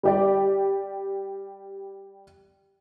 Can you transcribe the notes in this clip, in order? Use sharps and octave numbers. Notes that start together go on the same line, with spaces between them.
G3 G4 D5